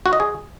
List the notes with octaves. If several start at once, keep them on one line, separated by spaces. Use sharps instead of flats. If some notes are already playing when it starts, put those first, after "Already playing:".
F#4
D#5
G#4